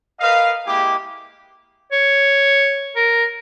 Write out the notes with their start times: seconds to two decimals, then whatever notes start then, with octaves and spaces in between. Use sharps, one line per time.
0.20 A#4 B4 D#5 F5
0.67 G#3 A#3 E4 G4 G#4 D6
1.92 C#5
2.96 A#4